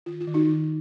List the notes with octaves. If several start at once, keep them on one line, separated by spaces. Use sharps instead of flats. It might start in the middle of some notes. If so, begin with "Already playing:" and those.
D#3 F4
F4
D#3
D#4 F#4
D#3